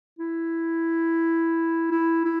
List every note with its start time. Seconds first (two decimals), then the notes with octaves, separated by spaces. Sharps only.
0.19 E4
1.91 E4
2.25 E4